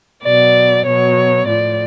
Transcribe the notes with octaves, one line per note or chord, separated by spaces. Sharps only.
B2 F#3 D5
B2 F#3 C#5
A2 F3 D5